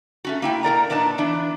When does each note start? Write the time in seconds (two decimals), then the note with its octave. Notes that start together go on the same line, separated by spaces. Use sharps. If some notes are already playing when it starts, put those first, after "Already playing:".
0.25 A3 C#4 F#4
0.42 A#3 E4 G5
0.63 B2 A#4 D5 A#5
0.90 A#2 B3 D4 D#4 A5
1.18 E3 B3 D4